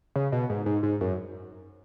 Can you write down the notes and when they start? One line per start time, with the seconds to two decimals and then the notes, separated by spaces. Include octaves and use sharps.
0.16 C#3
0.32 B2
0.50 G#2
0.66 G#2
0.83 G#2
1.01 F#2